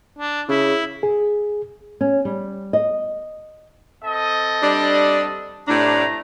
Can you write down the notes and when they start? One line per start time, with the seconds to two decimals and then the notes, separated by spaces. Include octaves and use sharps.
0.18 D4
0.49 C#3 E4
1.03 G#4
2.01 C#4
2.25 G3
2.73 D#5
4.03 C4 A4 D#5
4.63 G3 D4
5.68 A2 C3 A3 D4 A#5